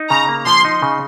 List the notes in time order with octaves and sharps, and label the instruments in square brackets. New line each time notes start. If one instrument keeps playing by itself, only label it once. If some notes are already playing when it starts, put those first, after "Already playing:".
Already playing: [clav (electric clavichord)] D#4
[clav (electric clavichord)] C#3 [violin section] A#5
[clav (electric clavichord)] A#3
[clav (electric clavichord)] F3 [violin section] C6
[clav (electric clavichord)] D#4
C#3